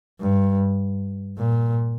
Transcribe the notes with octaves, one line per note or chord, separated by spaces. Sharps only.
G2
A#2